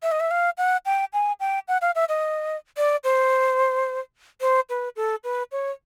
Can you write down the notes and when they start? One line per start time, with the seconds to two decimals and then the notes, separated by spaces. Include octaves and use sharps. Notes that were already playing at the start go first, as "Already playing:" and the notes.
0.03 E5
0.11 D#5
0.20 E5
0.31 F5
0.58 F#5
0.86 G5
1.13 G#5
1.40 G5
1.68 F#5
1.81 F5
1.95 E5
2.09 D#5
2.77 D5
3.04 C5
4.41 C5
4.70 B4
4.96 A4
5.24 B4
5.52 C#5